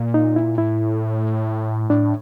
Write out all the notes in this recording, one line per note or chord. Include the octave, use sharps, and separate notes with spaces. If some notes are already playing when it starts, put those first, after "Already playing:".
Already playing: A#2
D#4
E4
A2 E4
A2 D4